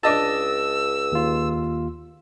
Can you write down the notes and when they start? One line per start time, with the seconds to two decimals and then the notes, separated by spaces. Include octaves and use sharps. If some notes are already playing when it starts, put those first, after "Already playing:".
0.03 C#2 D4 D#5 A5 E6
1.12 D#2 F4